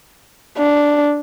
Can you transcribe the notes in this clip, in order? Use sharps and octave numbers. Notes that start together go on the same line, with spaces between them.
D4